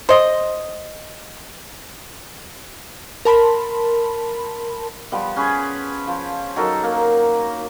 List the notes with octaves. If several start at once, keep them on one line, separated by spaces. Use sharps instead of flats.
C5 D#5
A#4 A5 B5 C6
F3 G3 B3
C#4 G#4 B4
F3
F#3 D#4 A4 A#4
A#3